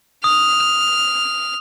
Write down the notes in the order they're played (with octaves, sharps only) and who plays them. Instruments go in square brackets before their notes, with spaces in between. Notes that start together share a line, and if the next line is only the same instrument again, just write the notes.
[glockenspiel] D#6 [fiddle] F6